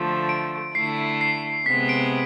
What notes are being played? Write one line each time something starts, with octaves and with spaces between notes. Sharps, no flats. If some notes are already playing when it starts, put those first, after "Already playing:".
Already playing: D3 F3 A3
D7
D3 A3 E4 C7
C7
C3 G#3 B3 B6
D7